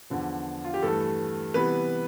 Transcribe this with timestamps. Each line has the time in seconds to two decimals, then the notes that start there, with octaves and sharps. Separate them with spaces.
0.10 E2 D3 F3
0.65 F4
0.74 G4
0.82 G2 E3 A3 A4
1.54 C3 E3 G3 B3 B4